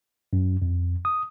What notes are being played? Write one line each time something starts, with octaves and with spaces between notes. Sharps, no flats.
F#2
F2
D#6